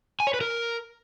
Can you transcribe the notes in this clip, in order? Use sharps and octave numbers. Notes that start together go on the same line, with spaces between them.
G#5
C#5
B4
A#4